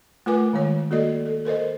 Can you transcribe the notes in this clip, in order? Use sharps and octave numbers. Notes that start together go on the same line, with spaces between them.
A3 F4 A#4 B4 G#5 D6
D#3 G#3 C#5
A#3 F#4 A4 D5 D#5
A4
A4 A#4 C5 D#5